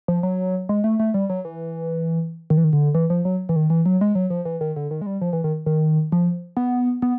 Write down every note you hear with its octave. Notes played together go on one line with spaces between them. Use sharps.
F3
F#3
G#3
A3
A3
G3
F#3
E3
D#3
E3
D#3
D3
E3
F3
F#3
E3
D#3
E3
F#3
G#3
F#3
F3
E3
D#3
D3
D#3
G#3
G3
F3
E3
D#3
D#3
F3
B3
B3